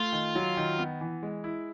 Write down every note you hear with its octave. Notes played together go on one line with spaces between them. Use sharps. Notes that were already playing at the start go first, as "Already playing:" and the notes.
Already playing: A3 F4
D#3
F#3
D#3
B3
E3
G#3
E4